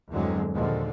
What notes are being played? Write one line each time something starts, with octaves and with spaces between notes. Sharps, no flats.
E2 G2 D3 F#3 G#3 C4
D#2 A#2 D3 F3 G#3